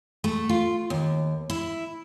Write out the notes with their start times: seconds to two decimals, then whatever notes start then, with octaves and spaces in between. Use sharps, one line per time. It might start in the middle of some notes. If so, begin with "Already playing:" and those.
0.24 A3
0.49 F4
0.90 D#2
1.50 E4